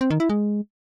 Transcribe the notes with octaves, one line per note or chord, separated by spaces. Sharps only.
C4
D#3
E4
G#3